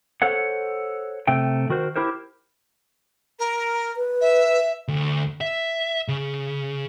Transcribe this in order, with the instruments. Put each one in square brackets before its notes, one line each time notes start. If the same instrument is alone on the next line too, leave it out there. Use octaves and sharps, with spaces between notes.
[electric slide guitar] A4 C5 C#5 F#5
C3 A3 G5
D#3 F#4 A#4 C5
E4 G4 A#4 C5
[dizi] A#4
[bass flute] B4
[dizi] E5
[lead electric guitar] D2
E5
C#3